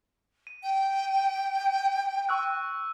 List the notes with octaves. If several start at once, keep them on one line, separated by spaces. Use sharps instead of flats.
D#7
G5
C#6 E6 F#6